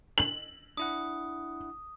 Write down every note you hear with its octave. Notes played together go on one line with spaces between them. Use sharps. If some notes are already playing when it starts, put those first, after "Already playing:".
F#7
D4 E4 F#5 D#6